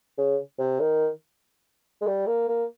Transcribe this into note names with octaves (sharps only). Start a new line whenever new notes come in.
C#3
C3
D#3
G#3
G3
A#3
A#3